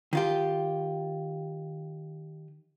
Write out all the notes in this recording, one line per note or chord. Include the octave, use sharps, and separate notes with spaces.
D#3 F4 G4